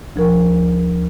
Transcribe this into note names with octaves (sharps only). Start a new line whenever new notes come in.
D2 F3 A#4